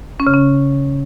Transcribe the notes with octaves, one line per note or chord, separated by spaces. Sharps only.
C#4
C#3
C#4